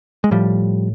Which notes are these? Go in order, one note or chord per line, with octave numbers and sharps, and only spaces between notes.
G#3
A2 F3 G3